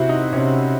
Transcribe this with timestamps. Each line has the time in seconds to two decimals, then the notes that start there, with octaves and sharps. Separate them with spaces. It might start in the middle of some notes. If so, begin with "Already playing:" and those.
Already playing: C3 C4 E4 F#4
0.09 D#4
0.33 C3 C#4